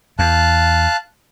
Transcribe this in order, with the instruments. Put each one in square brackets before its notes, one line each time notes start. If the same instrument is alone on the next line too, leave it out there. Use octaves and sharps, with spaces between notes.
[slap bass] E2 [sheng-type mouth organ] F5 A5 F#6